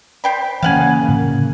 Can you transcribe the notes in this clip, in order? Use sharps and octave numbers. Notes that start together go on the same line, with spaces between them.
C5 G5 B5
C#3 E3 A#3 C#4 F5 F#5 G#5
A2 D3